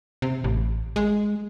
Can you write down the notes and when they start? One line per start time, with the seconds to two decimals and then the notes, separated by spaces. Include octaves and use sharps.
0.22 C3
0.44 A1
0.96 G#3